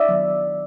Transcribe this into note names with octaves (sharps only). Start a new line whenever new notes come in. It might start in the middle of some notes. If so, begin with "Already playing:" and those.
Already playing: D5 E5
D#3 F#3 B3